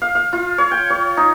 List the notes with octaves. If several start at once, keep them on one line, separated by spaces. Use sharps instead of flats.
F5
F5
F4
C#5
G5
C#5
D#4